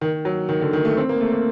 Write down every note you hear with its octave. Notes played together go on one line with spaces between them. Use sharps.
D#3
F#3
D#3
D3
D#3
A3
C4
A#3
A3
A#3